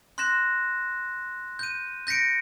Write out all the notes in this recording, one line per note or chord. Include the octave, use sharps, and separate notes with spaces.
C6 F#6 G6 A#6 E7
G6 D#7
G6 A#6 B6 C#7 D7